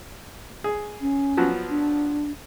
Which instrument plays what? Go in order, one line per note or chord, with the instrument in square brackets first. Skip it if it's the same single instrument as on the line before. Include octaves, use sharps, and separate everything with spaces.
[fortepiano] G#4
[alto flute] C#4
[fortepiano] F3 F#3 B3
[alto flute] D4